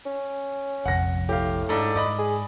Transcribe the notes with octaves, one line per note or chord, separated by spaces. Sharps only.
C#4
F1 A#1 F2 F#5 A#6
A2 G4 F5
G#2 D4 A4
G#2 D5 D#5 B5
G#4